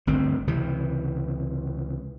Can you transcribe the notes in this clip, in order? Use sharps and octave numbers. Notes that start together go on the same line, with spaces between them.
G1 D2 C4
C#2 C3 E3